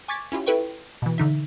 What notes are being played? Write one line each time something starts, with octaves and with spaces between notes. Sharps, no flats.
G#5 C#6 D6 G#6 A6 B6
C#4 E4 F4 G4
E4 A4 B4 G5 C#6
B2 E3
D3 D#4 E5